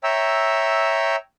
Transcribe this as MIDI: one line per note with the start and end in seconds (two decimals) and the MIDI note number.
0.04 1.16 73
0.04 1.16 76
0.04 1.16 79
0.04 1.16 82
0.04 1.16 88